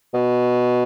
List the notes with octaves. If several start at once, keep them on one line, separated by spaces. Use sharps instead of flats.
B2